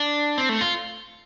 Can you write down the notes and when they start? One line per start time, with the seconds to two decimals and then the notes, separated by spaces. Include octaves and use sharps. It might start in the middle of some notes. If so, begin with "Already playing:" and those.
Already playing: D4
0.38 C4
0.49 A3
0.61 F4